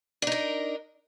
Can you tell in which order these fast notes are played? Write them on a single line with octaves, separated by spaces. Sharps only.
D4 D#4 A#4